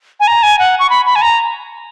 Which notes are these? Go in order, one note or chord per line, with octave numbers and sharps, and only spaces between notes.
G#5
A#5
G#5
F#5
C#6
B5
B5
G#5
A#5